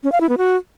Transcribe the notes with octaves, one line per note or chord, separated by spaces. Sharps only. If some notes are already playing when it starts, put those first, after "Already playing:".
C#4
F5
E4
B3
F#4